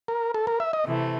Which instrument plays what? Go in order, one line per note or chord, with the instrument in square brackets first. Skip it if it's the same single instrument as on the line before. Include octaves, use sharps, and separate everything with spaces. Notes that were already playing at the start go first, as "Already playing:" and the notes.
[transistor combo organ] A#4
A4
A#4
E5
D#5
[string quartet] C3 E3 A3